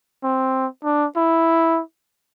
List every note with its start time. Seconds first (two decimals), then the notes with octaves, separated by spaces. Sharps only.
0.23 C4
0.84 D4
1.16 E4